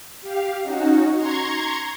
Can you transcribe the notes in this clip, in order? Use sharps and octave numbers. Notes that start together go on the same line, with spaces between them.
G4 F5
C#4 D#4 F#4
A#5 C6 C#6 G#6